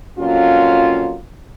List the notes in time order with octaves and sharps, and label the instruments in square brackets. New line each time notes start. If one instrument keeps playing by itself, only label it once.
[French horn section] F2 A#2 F#3 C#4 F4